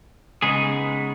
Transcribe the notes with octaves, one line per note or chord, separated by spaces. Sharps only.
C#3 G#3 B3 D#4 G#4